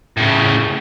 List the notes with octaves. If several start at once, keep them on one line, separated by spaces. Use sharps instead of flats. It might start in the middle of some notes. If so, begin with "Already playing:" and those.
A2 C#3